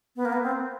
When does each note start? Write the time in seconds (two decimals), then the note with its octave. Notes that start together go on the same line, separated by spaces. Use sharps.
0.16 B3
0.25 A#3
0.33 B3
0.43 C4